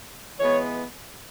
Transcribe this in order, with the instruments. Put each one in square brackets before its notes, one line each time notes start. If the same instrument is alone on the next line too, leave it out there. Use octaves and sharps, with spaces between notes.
[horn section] E3 G#3 B3 C#5